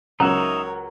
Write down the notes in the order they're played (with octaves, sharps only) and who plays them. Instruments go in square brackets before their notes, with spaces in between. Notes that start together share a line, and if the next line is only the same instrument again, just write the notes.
[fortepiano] C#2 F#3 F#6 [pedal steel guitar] D#4 E5 [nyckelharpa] A#4 C#5 [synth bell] A#5